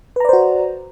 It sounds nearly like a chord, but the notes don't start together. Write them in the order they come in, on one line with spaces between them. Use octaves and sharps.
B4 A#5 D5 C5 F#4